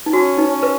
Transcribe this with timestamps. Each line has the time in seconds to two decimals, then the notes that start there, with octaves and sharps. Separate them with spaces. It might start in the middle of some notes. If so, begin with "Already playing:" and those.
0.06 D#4
0.13 C#4 F#4
0.38 D#4
0.50 C#4
0.63 B4